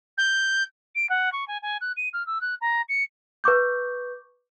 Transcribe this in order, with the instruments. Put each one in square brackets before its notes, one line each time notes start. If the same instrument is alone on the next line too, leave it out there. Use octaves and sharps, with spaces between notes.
[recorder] G6
[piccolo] D7
F#5
C#6
G#5
G#5
F#6
D#7
F6
E6
F#6
A#5
C#7
[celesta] B4 C#6 D6 G6